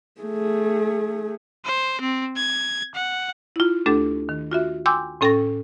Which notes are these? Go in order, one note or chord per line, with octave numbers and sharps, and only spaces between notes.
A3 G#4
C5
C4
G#6
F#5
E4 F4
D#2 A3 D4 G4 A4 A6
D#3
F4 F#4 E5
G5 G#5 C6 D6 E6 G6
A2 C#4 A4 G5 C#6 A#6